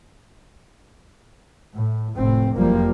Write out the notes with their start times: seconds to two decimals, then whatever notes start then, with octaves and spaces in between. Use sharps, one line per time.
1.76 A2
2.18 F1 A2 C4
2.56 F#1 F2 F3 G3 A#3